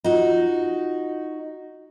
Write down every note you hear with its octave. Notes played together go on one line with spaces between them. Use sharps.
D#4 F4 F#4